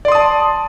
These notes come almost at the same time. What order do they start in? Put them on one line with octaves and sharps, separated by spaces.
D5 C6 D#6 A5